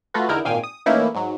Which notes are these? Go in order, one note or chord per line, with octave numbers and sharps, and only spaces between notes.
A3 F4 F#4 A4 B4
E2 D3 D#4 E4 A#4 D7
G#1 A#2 D#3 F5 G5 G#5
D#6
E3 A3 A#3 C#4 D#4 E4
G#2 F#3